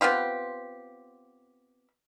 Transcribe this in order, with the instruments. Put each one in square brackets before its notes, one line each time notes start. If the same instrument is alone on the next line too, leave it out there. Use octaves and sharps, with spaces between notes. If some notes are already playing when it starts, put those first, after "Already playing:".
[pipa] B3 C4 F4 G4